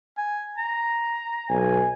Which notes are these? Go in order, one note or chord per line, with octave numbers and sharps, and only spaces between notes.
G#5
A#5
B1 G#5